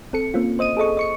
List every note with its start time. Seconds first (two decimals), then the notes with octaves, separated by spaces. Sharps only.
0.13 C4 A4 C#7
0.34 A#3 C4 C#4 F4
0.59 C5 D#5 D#6 D#7
0.77 G#4 A4 D#5 C#6
0.97 D#5 C#6 C#7